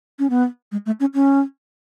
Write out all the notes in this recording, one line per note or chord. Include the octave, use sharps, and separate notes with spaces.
C#4
B3
G#3
A3
C#4
C#4